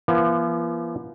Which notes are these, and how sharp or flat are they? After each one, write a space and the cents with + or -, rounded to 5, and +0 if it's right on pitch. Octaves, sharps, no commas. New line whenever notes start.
F3 -45 B3 -45